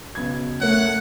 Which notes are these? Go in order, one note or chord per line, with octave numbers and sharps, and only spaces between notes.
B1 C#3 G#6
A3 A#4 C#5 F#5